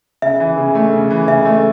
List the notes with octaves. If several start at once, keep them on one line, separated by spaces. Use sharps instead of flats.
C#3 E5
E3
C#3
A3
C#3
E3
C#3 E5
A3